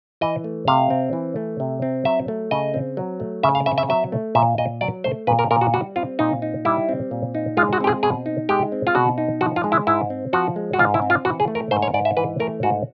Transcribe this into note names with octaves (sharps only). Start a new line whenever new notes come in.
E3 D#5
A3
C3 F5
C4
E3
A3
C3
C4
F#3 E5
A3
C#3 D#5
C4
F#3
A3
C#3 E5
F5
C4 E5
E5
F#3 E5
A3
A#2 E5
A#2 D#5
F#3 D5
A3 C5
A#2 B4
A#4
A#2 A#4
F#4
G3 F#4
C4 F4
A#2 D#4
D#4
G3 E4
C4
A#2
D#4
G#3 F4
F#4
C4 G4
G#4
B2 G#4
D#4
G#3 G4
C4
F4
B2 F#4
D#4
F3 F#4
F4
G#3
E4
G#2 E4
C4
F3 F#4
G#3
F#4
G#2 F4
E4
C4
F4
E3 F#4
G#4
A3
A#4
G#2 C5
C#5
G#2 D5
E5
E3 B4
A3 A#4
G#2 F#4